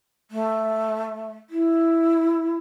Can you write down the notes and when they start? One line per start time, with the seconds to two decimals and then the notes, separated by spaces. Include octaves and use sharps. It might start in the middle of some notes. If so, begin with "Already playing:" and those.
0.31 A3
1.50 E4